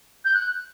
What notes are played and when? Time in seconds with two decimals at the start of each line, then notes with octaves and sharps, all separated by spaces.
0.25 G6
0.34 F#6